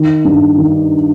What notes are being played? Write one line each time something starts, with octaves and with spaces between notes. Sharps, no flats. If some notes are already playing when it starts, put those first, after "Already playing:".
Already playing: D#3
G2
D#3